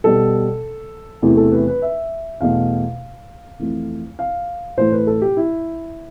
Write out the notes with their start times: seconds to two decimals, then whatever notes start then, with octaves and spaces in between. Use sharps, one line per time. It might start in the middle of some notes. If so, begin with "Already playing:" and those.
0.04 B2 G3 A4
1.22 E2 C3 E3 A3
1.37 A4
1.52 B4
1.67 B4
1.82 E5
2.41 E2 B2 A3 F5
3.59 F2 E3 A3
4.19 F5
4.77 A2 E3 A3 C5
4.92 B4
5.07 A4
5.22 G4
5.37 E4